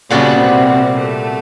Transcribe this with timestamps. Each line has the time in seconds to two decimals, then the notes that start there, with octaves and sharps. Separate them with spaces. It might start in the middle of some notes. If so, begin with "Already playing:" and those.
0.10 A#2 C#3 G3 B3 C#4 D4 F#4
0.39 C3 C4
0.97 A3